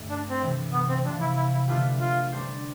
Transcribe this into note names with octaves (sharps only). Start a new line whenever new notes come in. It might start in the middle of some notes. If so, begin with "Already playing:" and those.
Already playing: G2 D3 A3
D4
C4
C3 E3 A3
B3
C4
C3 F3 C4 D4
E4
E4
E4
D3 A3 E4 F4 G4 B4
F4
G3 D4 G4 C5